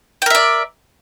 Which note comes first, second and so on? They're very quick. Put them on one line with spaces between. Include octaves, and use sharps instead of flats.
G5 A#4 E5 D5